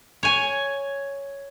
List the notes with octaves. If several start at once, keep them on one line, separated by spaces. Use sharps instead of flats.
C#5 G#5